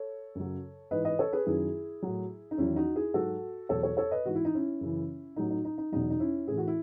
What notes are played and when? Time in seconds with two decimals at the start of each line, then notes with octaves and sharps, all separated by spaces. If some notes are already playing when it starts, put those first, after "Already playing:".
Already playing: A4 C#5
0.35 F#2 C#3 F#3
0.91 G#2 E3 B4 D#5
1.05 B4 D#5
1.19 A4 C#5
1.33 G#4 B4
1.46 F#2 D#3 F#3 E4 G#4
2.03 A2 F#3
2.51 D#4
2.58 E2 D#3 F#3 C#4 E4
2.76 D#4 F#4
2.95 E4 G#4
3.14 G#2 F#3 F#4 A4
3.69 E2 B2 F#3 A4 C#5
3.83 A4 C#5
3.97 A4 C#5
4.11 B4 D#5
4.25 G#2 E3 F#4
4.35 E4
4.45 D#4
4.55 C#4 E4
4.81 F#2 C#3 E3
5.36 A2 F#3 D#4
5.50 D#4
5.65 D#4
5.78 D#4
5.92 E2 B2 F#3 D#4
6.10 D#4
6.20 C#4 E4
6.48 A2 E3 G#4
6.58 F#4
6.67 E4